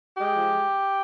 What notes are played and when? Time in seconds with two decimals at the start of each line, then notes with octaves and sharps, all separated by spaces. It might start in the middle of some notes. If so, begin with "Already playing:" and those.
0.17 G#3 G4
0.37 F3